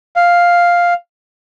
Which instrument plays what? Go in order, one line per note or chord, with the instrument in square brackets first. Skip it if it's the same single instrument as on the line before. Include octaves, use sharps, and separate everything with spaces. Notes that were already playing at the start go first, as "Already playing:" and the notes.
[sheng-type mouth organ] F5